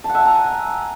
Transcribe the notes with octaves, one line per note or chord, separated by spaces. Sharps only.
A5
F#5
E5
G#5
A#5